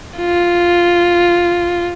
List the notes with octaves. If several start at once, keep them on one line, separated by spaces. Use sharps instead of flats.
F4